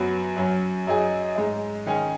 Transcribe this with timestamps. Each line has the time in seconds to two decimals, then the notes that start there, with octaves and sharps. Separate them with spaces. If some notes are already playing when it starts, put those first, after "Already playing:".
Already playing: F#2 F#3 B3 F#4
0.36 F#2 F#3 C#4
0.87 F#2 F#3 D#4 G#4
1.36 G#2 G#3 D#4
1.86 D#3 G#3 C#4 G#4